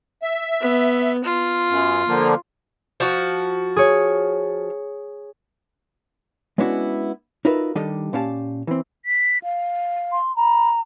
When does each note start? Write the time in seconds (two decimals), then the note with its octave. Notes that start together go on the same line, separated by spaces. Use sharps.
0.22 E5
0.61 B3
1.24 F4
1.69 F#2
2.08 D3 F3 A#3
3.00 F3 F#4
3.76 G#4 C#5
6.58 G#3 B3 C#4 D4 E4 F#4
7.45 D#4 F4 F#4 A#4 B4 E5
7.75 D#3 G3 D4 G4 A4 D#5
8.13 A#2 C#4 G4 F5 A5
8.67 E3 C4
9.05 B6
9.43 F5
10.12 C6
10.36 A#5 B5